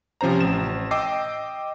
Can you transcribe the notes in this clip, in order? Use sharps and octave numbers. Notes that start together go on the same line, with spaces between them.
C3 F3 C#4 C5 A#5
A1 E7
D#5 G5 D6 E6 C7